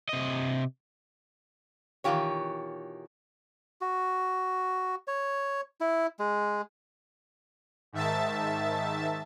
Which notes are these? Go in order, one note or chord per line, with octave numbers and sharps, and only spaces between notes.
C3 D#5
B2 D#3 E3 F4 G4 C#5
F#4
C#5
E4
G#3
G#2 D#3 E5 A5 A6